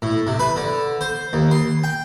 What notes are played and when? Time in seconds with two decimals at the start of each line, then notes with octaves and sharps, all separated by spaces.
0.02 A2
0.27 C3
0.39 B4
0.56 D3
1.01 C5
1.33 D#2
1.51 C6
1.84 G5